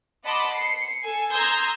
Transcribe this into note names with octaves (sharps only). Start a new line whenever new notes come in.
D#5 F#5 A5 B5 C6 D6
C7 C#7
A4 G#5
A#5 C6 D#6 E6 G6 G#6